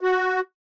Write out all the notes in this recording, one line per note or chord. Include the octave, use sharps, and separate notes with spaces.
F#4